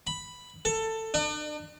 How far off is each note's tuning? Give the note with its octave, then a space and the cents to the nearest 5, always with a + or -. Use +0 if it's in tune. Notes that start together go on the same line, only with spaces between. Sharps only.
B5 +5
A4 +15
D4 +40